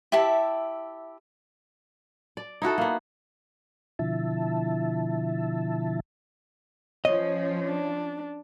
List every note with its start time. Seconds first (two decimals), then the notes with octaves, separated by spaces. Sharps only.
0.12 E4 G4 E5 A5
2.37 D5
2.62 D#4 E4 F#4 A4
2.78 A#3 B3
3.99 B2 D3 F3 E4 E5 A5
7.05 F3 C#4 C#5 D#5
7.66 D4